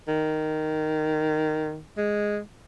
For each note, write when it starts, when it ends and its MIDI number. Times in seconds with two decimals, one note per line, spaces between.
0.08 1.80 51
1.97 2.39 56